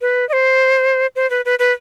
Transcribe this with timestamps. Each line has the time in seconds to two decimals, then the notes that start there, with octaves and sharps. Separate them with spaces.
0.01 B4
0.29 D#5
0.33 C5
1.16 C5
1.30 B4
1.45 B4
1.59 B4